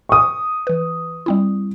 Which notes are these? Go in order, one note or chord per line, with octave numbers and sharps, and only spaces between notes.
C#6 D#6
E3 B4
G3 C4 E4